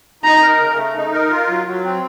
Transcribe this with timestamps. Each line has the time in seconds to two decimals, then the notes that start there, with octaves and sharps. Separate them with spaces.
0.23 D#4 A#5
0.41 A#4
0.60 C#3
0.77 A3
0.96 D#4
1.12 A#4
1.30 F4
1.49 F#3
1.66 F#3
1.84 C4